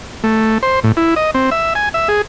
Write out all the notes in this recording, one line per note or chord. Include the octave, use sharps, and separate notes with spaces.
A3
C5
A2
E4
D#5
C4
E5
G#5
E5
G#4